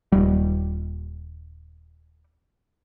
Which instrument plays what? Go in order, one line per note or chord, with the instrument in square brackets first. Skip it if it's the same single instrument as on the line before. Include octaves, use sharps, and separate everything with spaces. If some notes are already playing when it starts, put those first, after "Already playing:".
[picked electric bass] D#1 G3